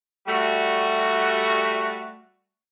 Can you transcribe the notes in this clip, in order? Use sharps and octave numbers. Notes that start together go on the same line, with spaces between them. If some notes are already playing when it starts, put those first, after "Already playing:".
G3 A3 F#4